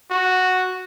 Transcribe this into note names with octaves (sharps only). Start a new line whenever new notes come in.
F#4